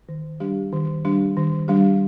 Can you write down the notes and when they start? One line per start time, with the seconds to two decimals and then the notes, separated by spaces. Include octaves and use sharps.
0.09 D#3
0.40 G3 D4 G4
0.72 D#3
1.05 G3 D4 G4
1.37 D#3
1.68 G3 D4 G4